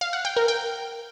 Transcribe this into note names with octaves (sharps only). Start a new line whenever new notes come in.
F5
F#5
G5
A#4
G5